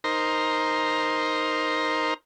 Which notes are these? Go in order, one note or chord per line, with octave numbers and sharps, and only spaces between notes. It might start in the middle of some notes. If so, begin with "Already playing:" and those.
D#4 A#4 C5